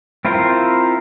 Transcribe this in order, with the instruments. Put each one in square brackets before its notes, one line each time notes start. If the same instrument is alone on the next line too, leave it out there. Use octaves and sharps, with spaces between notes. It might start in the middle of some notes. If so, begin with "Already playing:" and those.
[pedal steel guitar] C4 E4 F4 A#4 C5